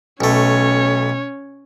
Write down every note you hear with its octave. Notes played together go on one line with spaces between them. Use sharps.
B1 A3 C#4 C#5